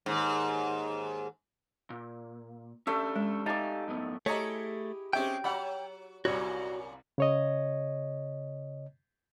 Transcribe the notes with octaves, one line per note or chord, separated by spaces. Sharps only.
D#2 G#2
A#2
A3 C#4 D4 G4 E5
G#3
D#4 G4 D5 F5 G#5 A5
F#2 A2 B3
A3 E4 G4 G#4 C#5 D#5 A#5
F#3 G#3 C4 C#4 G4 E5 G5
F#3 F#5 B5
C2 F#2 A#2 G3 F#4 C#5
C#3 C#5 D#5